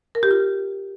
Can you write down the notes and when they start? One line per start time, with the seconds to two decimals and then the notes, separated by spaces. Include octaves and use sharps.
0.15 A#4
0.23 G4
0.31 F4